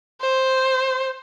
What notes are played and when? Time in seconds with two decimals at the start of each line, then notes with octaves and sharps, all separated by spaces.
0.21 C5